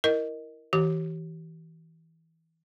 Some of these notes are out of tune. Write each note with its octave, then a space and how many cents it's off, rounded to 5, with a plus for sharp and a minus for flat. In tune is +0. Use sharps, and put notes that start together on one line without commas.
E4 +0 A#4 +0 D#5 +0
E3 -25 G4 -35